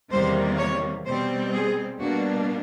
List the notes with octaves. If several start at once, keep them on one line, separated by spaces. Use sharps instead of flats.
E2 C3 D#3 G3 A#3 C5
C#5
B2 G3 C4 C5
G#4
B2 G3 A#3 D4 F#4